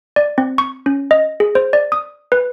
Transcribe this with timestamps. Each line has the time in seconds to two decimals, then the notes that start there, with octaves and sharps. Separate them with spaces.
0.16 D5
0.38 C4
0.58 C#6
0.86 C#4
1.11 D#5
1.40 G#4
1.55 C5
1.73 D5
1.92 D#6
2.32 B4